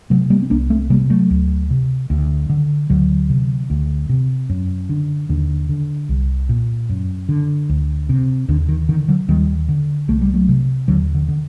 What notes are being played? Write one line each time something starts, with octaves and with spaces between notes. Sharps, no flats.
C3 F#3 A3
G3 A#3
C4
C2 A#3 D4
A3 C4
C3 G3 A#3
F#3 A3
D2
C3
D2
D3
D2 D3 F#3
C3
D2
C3
F#2
D3
D#2 D3
D3
C2
A#2
F#2
D3
D2
C3
D#2 D3
D#3
D3 D#3
D3 F#3
D#2 D#3 G3
D3
C2 A3
G3
F#3 A3
C3
D#2 D3 F#3
D3
D3